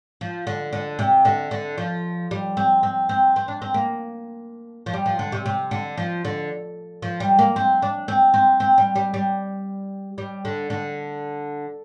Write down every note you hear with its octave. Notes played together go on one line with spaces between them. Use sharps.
F3
D3
D3
C3
D3
D3
F3
G3
C4
C4
C4
C4
D4
C4
A#3
F3
G3
F3
D3
C3
C3
D3
F3
D3
F3
G3
A#3
C4
D4
C4
C4
C4
G3
G3
G3
G3
D3
D3